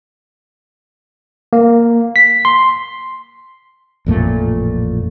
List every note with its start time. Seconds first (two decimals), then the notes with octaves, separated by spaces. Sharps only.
1.53 A#3
2.16 B6
2.45 C6
4.06 A1 F2 A#2 A3